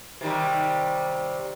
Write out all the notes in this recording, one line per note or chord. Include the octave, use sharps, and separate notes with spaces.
C3 D#3 G3